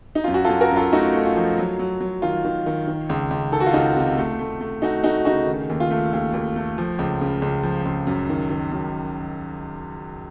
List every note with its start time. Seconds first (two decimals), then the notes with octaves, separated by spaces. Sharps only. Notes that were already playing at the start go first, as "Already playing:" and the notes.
0.15 D#4
0.24 F#2 F4
0.34 F#4
0.45 F4 A4
0.49 F#2
0.61 F#4 A#4
0.71 F#2
0.76 F4 A4
0.92 A3 D#4 F#4
1.15 A3
1.26 F4
1.36 F3
1.58 F#3
1.79 F#3
2.01 F#3
2.22 D#3 F4
2.44 D#3
2.66 D#3
2.87 D#3
3.09 C#2
3.30 C#2
3.52 D#3 A4
3.60 F#4
3.66 F4
3.73 C#2 D#4 F#4
3.96 C3
4.18 A3
4.39 A3
4.61 A3
4.82 A3 D#4 F#4
5.04 A3 D#4 F#4
5.25 C#3 D#4 F#4
5.47 D#3
5.69 D#2
5.80 F4
5.91 A3
6.13 D#2 F4
6.33 D#2
6.56 A3
6.78 F3
6.99 C#2
7.21 C#3
7.42 C#2
7.63 F3
7.85 C#2
8.07 F#2
8.29 D#3
8.50 D#3
8.72 F#2